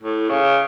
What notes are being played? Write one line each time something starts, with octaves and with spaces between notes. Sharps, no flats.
A2
C#3